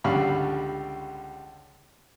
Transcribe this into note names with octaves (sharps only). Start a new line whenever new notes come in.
C#2 D3 G3 F5 B5 C#6